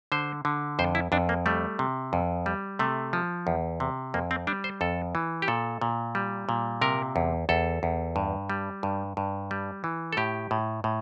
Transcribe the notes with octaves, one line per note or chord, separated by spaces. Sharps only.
D3 C5
D3
F2 C5
E4
F2 D4
A#3
G3 A3
C3
F2
G3
C3 A3
F3
E2
C3
F2 A#3
C4
G3 D4
C5
F2 A4
E3
G4
A#2 A4
A#2
G3
A#2
C3 A#4
E2
E2 A4
E2
G2
G3
G2
G2
G3
E3
A4
A2 G4
A2
A2